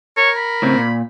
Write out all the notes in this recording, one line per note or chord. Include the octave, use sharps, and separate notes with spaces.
A#4 C#5
B5
A2 C#3 C4
A#2